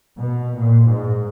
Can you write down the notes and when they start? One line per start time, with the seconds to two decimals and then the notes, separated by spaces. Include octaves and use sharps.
0.18 B2
0.56 A#2
0.88 G#2